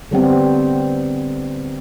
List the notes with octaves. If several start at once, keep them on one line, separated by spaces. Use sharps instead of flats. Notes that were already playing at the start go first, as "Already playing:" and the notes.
D3 G3 B3 C4